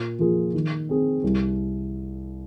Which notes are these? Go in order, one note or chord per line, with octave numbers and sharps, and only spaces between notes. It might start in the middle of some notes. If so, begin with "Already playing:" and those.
Already playing: A#2
F3 A#3 F4 G#4
D#3
C4 G#4
C2